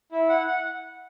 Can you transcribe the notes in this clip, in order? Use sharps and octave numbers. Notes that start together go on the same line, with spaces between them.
E4
F#5
F#5